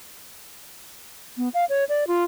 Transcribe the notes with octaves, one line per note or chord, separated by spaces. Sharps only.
B3
F5
C#5
D5
F4